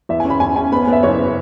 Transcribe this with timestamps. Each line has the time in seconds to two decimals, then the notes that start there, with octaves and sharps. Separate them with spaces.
0.09 E2 E5
0.20 G#5
0.24 C#4
0.30 B5
0.40 C#4 G#5
0.56 C#4 G#5
0.72 B3 B5
0.88 B3
0.93 E5
1.03 F#1 C#5